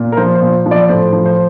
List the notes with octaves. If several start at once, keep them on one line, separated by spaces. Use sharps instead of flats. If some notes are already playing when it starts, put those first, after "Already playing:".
Already playing: A#2
A#4
F3 C5
C5
A#2
F3
D5
A2 C5
F3
C5